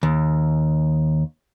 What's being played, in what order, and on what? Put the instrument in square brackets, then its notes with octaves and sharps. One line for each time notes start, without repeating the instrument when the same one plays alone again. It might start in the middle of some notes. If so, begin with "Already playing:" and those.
[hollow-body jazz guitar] D#2